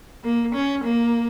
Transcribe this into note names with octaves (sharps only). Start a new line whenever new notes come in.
A#3
C#4
A#3